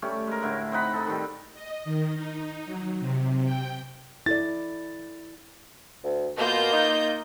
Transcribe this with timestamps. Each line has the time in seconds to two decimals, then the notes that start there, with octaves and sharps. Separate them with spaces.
0.02 G3 A3 C#4 G4
0.27 G#3 A#4
0.42 A2 D3 E4
0.72 C4 D#4 F#5 B5
0.93 D#4 A4
1.07 D#3 G3
1.54 D#5
1.84 D#3
2.15 D#4
2.65 F#3
3.00 C3
3.45 G5
4.26 E4 A4 D5 A6
6.04 D2
6.37 B2 A#3 F4 G6
6.73 D#4